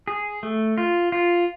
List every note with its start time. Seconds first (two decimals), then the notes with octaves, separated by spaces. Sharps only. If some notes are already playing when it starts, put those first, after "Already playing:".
0.08 G#4
0.43 A3
0.78 F4
1.12 F4